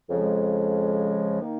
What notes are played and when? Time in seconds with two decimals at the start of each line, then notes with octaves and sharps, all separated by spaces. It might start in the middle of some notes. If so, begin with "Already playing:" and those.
0.10 F2 C#3 F3 G#3
1.41 D#3 A#3 D#4